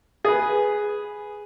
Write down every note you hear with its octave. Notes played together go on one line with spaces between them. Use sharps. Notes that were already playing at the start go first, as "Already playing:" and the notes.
G#4 B4